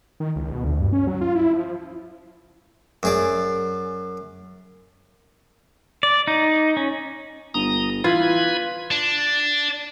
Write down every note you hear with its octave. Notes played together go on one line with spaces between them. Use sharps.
D#3
C#2
B2
D2
G2
C#4
F#3
F4
E4
F3
F#2 G#4 D5
D5
D#4
C#4
G1 A#5 D#6
E3 F4 B4 B5 G#6
D4